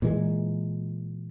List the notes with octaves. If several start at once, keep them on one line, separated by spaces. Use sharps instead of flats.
A#2 E3 G#3